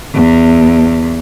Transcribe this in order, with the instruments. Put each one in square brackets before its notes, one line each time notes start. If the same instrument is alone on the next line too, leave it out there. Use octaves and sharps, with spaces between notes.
[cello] E2